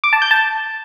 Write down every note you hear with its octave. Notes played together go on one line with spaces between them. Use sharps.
D6
A5
G6
A5